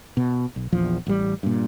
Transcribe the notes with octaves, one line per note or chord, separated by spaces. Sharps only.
B2
B1
A#1 E2 F3
A1 G3
G2 A#2